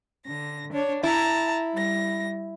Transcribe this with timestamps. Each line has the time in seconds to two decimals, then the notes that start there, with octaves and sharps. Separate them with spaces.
0.27 D3 A#6
0.72 D4 C#5
1.03 E4 A5 A#5
1.73 G3 A#6